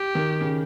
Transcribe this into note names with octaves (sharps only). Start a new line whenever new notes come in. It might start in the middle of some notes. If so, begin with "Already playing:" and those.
Already playing: G4
D#3
C#3